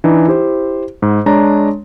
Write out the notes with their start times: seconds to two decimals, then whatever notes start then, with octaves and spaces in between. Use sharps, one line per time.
0.04 E3 D4 D#4
0.27 E4 G4 C5
1.02 G#2
1.26 G#3 D4 C#5 A#5